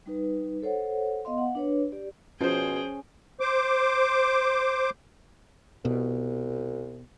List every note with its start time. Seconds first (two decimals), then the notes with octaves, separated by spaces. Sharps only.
0.06 G3 D#4 B4
0.63 A4 C5 C#5 F#5
1.25 B3 D#5 F5 C6
1.38 F#5
1.55 D4 B4 C#5
1.92 G4 D5
2.41 B2 F3 C#4 G#4 C5 G5
3.40 C5 D6
5.85 C2 B2